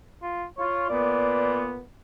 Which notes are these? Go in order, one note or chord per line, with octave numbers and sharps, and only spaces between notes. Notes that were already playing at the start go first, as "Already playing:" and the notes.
F4
F4 C#5
A#2 B3 D5